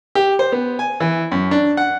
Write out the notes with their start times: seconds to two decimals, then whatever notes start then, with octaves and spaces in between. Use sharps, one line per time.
0.15 G4
0.39 C5
0.52 B3
0.79 G#5
1.00 E3
1.32 F#2
1.51 D4
1.77 F#5